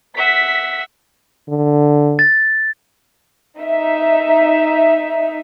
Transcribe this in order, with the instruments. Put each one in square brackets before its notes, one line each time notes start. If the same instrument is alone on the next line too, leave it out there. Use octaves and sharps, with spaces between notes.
[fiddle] E5 F#5 [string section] B6
[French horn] D3
[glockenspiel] A6
[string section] D#4 E5